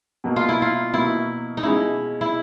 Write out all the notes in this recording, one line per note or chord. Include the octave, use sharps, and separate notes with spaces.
B2 F#3 A#3
F4
E4
F4
B2 F#3 A#3 E4
D#4
B2 G#3 C#4 E4 F4
E4